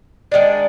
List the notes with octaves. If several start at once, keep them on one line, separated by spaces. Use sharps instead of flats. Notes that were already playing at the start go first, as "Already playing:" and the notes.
D#3 G#3 D4